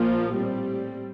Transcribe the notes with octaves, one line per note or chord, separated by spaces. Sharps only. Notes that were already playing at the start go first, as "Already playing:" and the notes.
Already playing: A#1 A#2 F3 A#3
A2 G3 C4